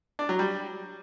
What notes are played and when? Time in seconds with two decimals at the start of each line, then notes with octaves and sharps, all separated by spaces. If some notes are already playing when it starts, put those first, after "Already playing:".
0.19 D4
0.29 F#3
0.39 G3